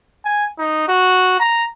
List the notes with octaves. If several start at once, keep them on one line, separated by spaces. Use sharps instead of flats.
G#5
D#4
F#4
A#5